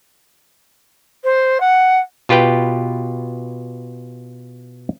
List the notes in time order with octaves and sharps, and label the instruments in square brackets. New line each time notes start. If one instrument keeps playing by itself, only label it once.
[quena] C5
F#5
[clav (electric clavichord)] B2 F4 G4 B4 G5